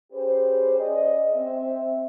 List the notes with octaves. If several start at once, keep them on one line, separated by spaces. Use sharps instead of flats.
C#4 G4 G#4 B4 C5
C#4 G#4 D5 D#5
C4 E5